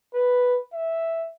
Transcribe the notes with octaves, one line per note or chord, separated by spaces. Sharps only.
B4
E5